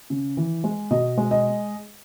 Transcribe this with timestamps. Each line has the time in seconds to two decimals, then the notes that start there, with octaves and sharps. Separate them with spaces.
0.10 C#3
0.37 E3
0.64 G#3
0.91 B2 D#5
1.18 G#3
1.31 D#5